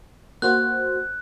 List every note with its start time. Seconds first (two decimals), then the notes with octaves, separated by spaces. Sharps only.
0.42 A#3 F#4 C5 F#6